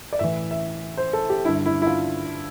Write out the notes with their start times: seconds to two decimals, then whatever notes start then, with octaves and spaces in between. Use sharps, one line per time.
0.13 D5
0.19 A2 E3 E5
0.51 E5
0.97 C5
1.13 A4
1.30 G4
1.45 G2 D3 E4
1.66 E4
1.82 E4
1.86 F4